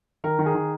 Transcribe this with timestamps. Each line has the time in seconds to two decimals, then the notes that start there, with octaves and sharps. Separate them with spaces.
0.24 D#3 A#4
0.39 D#3
0.46 G#4
0.55 D#3